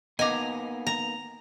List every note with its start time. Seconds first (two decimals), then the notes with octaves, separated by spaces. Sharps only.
0.19 A#3 B3 D#4 D#5 G#5 A#5 D6
0.87 A#5